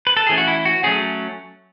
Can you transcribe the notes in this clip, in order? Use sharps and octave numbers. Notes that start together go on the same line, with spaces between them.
B4
A4
E3 A3 C#4 G#4
F#4
E4
F#4
F#3 A3 C#4 G#4